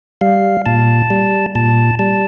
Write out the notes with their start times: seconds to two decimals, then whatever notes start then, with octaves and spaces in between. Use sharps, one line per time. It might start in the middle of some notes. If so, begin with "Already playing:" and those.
0.21 G3 F5
0.66 A#2 A5
1.10 G3
1.55 A#2 A5
1.99 G3 A5